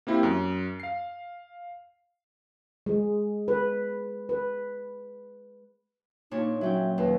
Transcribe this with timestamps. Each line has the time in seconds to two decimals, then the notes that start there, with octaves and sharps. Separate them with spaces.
0.07 A#3 C4 E4 G4
0.23 F#2
0.80 F5 C7
2.86 G#3
3.48 B4
4.29 B4
6.31 A#2 D4 D#4 C#5
6.61 F#3 C#4 E5 G5
6.98 D#2 B4